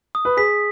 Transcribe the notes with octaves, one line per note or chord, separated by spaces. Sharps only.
D#6
B4
G#4 B6